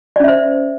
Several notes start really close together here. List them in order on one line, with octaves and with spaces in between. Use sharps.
D5 C#4 E5 C5